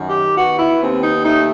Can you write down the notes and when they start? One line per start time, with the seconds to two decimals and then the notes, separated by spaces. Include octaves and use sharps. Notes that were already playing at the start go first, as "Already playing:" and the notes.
Already playing: F#2 D#3
0.09 G4
0.37 B3 F#4
0.59 E4
0.81 D#2 C4
1.03 D#4
1.24 A3 D#4